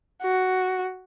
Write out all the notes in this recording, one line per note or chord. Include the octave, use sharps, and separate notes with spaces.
F#4